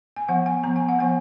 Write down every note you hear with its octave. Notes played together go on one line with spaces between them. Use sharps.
G#5
F3 B3 F#5
G#5
F3 B3 A#5
G#5
F#5
F3 B3 G#5